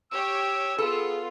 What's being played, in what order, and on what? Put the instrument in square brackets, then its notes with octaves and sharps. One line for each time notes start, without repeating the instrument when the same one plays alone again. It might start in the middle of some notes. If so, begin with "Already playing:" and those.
[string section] G4 C#5 [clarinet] E6
[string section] B3 F4 [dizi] G#4 [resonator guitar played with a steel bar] A4